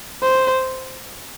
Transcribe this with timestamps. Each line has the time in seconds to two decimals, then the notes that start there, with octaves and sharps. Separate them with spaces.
0.23 C5